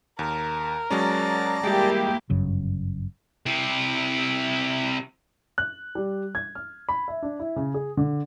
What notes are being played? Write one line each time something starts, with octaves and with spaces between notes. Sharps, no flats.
D#2 A#4
F#3 G#3 C#4 D5 A5 A#5
G3 G#3 A#3 E4 G4
G1 F#2 C#3
C3 E4
F#6
G3
G#6
F6
B5
E5
D4
E4
C#3
G#4
D3